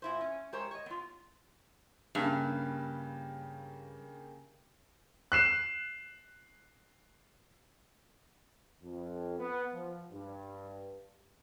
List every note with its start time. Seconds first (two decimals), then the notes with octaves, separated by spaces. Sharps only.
0.02 A#2 E4 C5
0.21 C#4
0.53 G#3 G4 A#4 C5 C#5
0.71 C#5 D#5
0.86 B3 F4
2.15 G2 C#3 A#3 G4
5.32 F#6 C7 E7
8.82 F2
9.38 B3
9.73 F3
10.12 G2